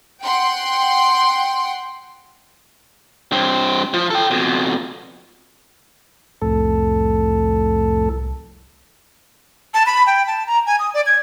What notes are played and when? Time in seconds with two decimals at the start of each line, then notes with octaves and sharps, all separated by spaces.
0.23 F#5 G5 C6
3.32 G2 C4
3.94 F3
4.10 A4 G5
4.31 F2 B2
6.42 C2 F2 A2 A4
9.74 A5
9.86 B5
10.07 G5
10.27 A5
10.47 A#5
10.66 G#5
10.79 D#6
10.94 D5
11.06 G#6